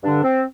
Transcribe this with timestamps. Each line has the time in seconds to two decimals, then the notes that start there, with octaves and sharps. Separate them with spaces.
0.03 G2 D3 D4
0.24 C4